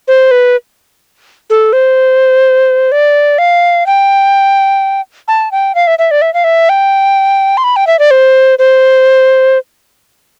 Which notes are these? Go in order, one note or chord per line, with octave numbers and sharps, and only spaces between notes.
C5
B4
A4
C5
D5
F5
G5
A5
G5
F5
E5
E5
D5
E5
F5
E5
G5
C6
B5
G5
E5
D5
C5
C5